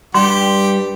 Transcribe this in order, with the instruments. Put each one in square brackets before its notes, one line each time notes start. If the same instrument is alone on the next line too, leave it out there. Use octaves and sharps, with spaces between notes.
[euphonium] G2 [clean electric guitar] G3 [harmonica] G4 [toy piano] C6